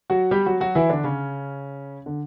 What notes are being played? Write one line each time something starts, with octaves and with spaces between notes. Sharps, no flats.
F#3 F#4
G3 G4
F#3 F#4
F#3 F#4
E3 E4
D3 D4
C#3 C#4
D3